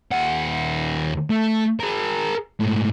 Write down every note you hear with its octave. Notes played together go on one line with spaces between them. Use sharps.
D#2 F#5
A3
G#4 A#4
G#2 A3